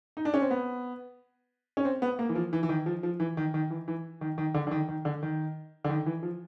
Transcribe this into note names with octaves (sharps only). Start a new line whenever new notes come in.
D#4
D4
C#4
C4
B3
C#4
C4
B3
A#3
E3
F3
E3
E3
D#3
F3
F3
E3
D#3
D#3
E3
E3
D#3
D#3
D3
D3
D#3
D#3
D3
D#3
D3
D#3
E3
F3